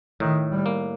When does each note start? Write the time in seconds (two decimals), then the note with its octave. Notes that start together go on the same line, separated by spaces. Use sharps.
0.20 A2 D#3
0.51 G3
0.66 A#3